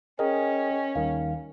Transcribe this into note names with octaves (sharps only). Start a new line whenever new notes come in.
C#4 G#4 A#4 D#5 G5
D#2 D#3 G3 F5